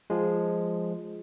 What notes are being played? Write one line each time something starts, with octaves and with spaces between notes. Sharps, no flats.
F3 G#3